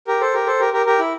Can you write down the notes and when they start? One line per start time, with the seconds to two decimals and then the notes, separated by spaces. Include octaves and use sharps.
0.07 G4 A#4
0.21 A4 C5
0.34 G4 A#4
0.47 A4 C5
0.60 G4 A#4
0.73 G4 A#4
0.86 G4 A#4
0.99 E4